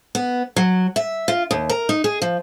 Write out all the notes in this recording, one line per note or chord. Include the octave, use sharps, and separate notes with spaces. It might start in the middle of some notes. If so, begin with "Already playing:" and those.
B3
F#3
E5
F4
D#2
A#4
D#4
G#4
F3